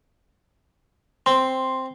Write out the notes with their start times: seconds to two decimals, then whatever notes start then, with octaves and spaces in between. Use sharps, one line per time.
1.26 C4 C6